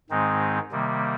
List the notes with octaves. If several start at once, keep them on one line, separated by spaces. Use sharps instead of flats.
G#2 D#3 G#3 C4 D#4
C3 D#3 G3 A#3